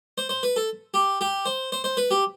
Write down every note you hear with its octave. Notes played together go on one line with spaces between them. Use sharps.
C5
C5
B4
A4
G4
G4
C5
C5
C5
B4
G4